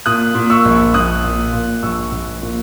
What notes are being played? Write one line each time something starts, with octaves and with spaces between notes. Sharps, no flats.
A#2 D#6 F#6
A#2
C#6 E6
A#1
A#1 D#6 F#6
A#2
A#2
A#1 C#6 E6
A#1
A#2